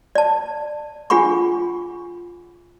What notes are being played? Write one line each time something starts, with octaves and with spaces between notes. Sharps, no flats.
D5 A5
D4 F4 G#4 F#5 B5 C#6